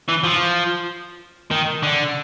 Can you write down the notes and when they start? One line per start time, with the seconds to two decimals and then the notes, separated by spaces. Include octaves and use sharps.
0.08 E3
0.24 F3
1.51 D#3
1.83 D3